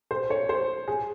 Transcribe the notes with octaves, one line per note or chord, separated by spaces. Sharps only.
C5
C#5
C5
G#4